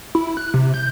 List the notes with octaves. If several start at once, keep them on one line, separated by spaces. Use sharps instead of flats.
E4
F#6
C3
G6